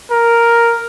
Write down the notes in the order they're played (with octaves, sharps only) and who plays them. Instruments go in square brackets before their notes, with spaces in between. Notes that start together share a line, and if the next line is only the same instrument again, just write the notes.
[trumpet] A#4